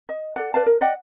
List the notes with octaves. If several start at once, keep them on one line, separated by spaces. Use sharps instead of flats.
D#5
A4 D5 F#5
B4 D5 F5 A5
A#4
D5 D#5 F#5 G5